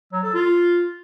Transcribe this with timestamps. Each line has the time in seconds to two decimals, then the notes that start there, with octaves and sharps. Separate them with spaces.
0.13 F#3
0.23 A4
0.34 F4